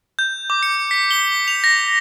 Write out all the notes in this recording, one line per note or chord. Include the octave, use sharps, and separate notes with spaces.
G6
D6
C#7
B6
G7
F7
A#6